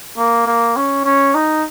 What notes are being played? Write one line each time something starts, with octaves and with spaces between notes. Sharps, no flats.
A#3
A#3
C#4
C#4
D#4